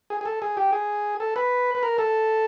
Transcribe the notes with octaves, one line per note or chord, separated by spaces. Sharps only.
G#4
G#4
A4
G#4
G4
G#4
A4
B4
B4
A#4
A4